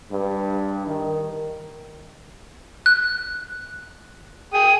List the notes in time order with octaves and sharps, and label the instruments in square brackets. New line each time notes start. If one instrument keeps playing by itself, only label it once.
[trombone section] G2
D#3
[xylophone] F#6
[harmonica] G#4 G5 D#6